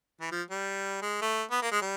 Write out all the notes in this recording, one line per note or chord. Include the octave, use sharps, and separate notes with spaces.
E3
F3
G3
G#3
A3
B3
A#3
G#3
G3